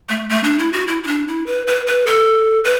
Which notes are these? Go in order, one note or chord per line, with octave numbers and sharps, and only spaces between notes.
A3
A3
D4
E4
F#4
E4
E4
D4
E4
B4
B4
B4
A4
B4